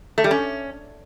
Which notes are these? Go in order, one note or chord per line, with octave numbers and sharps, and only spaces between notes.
A3
G3
C#4